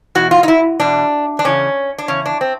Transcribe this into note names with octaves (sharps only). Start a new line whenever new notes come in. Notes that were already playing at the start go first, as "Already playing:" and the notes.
E2 B2 F#4
F4
D#4
E4
E2 B2 D4
D4
E2 C#3 E3 C#4
D4
E2 C#3 C#4
D4
C4